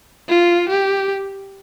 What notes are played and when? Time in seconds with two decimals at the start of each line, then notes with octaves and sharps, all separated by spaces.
0.29 F4
0.69 G4